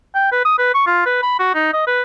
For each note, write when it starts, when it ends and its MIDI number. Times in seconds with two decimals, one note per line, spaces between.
0.14 0.30 79
0.32 0.40 71
0.45 0.55 87
0.59 0.72 71
0.74 0.82 85
0.87 1.02 65
1.06 1.21 71
1.22 1.39 83
1.39 1.55 66
1.55 1.71 63
1.73 1.85 75
1.87 2.02 71